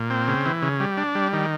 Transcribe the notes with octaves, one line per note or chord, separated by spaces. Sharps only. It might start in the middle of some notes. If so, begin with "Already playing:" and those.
Already playing: A#2
C4
C#3
E3
C#3
G3
D4
G3
D#3